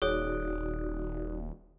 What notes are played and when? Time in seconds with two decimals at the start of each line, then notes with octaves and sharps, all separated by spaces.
0.02 D#1 D#4 F#4 G#4 C#5 D5